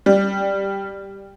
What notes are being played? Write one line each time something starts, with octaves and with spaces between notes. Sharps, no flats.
G3